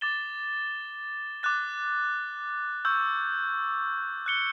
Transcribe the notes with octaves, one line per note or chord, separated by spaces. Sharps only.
D6 A6 E7 G7
D6 F#6 A6
C#6 E6 G6
F#6 C#7 G7